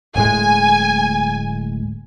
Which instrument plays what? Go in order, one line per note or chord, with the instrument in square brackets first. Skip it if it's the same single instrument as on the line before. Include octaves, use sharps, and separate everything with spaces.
[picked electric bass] D1 A2 G#3 [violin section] G#5